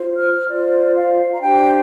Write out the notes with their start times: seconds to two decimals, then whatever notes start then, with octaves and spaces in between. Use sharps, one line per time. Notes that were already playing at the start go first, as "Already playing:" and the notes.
Already playing: F4 C5
0.17 F6
0.48 F4 C5 D5
0.95 F5
1.32 A#5
1.41 D4 G4 C5 G5